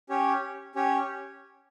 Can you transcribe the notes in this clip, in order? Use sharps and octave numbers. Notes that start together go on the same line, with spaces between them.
C#4 G4 C#5
C#4 G4 C#5